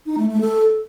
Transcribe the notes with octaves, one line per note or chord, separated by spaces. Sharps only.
D#4
A3
A3
A4